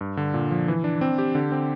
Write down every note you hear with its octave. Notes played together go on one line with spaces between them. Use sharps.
G2
D3
A#2
F3
E3
D4
C4
G4
D3
C4